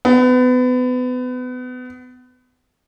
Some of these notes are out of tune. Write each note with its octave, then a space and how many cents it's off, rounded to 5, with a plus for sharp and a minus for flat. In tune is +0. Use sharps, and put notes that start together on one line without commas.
B3 +30